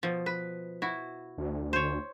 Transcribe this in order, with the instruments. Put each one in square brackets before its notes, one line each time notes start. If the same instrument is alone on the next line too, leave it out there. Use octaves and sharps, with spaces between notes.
[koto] B2 F3
B4
E4 F#4
[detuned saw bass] D2
[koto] C5 C#5